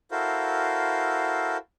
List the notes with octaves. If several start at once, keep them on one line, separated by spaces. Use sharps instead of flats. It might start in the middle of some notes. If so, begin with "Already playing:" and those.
E4 F#4 A4 A#4 C5 F5